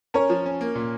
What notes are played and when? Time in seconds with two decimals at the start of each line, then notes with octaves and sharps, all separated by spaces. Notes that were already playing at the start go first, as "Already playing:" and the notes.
0.14 C#4 A#4 C#5
0.30 F3
0.46 C#4
0.61 A#3
0.75 A#2